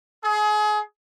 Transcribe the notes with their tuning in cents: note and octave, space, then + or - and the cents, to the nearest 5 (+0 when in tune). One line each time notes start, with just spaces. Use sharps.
G#4 +30